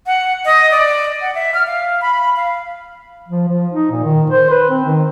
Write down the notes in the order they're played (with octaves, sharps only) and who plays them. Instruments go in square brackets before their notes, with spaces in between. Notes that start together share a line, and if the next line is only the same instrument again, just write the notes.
[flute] F#5
D#5
D5
F#5
E5
F6
F5
B5
F5
[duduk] F3
F3
D#4
A#2
D#3
C5
B4
C4
D#3